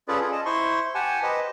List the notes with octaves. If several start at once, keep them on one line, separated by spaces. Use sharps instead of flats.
C#4 F4 G#4 A4 B4 D5
F4 G#4
D#5 A5
E4 C5 C6 C#6
G4 F#5 G#5 A5
G4 B4 C5 D#5